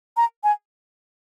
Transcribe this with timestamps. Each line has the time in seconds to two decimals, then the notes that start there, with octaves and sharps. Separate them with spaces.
0.17 A#5
0.44 G#5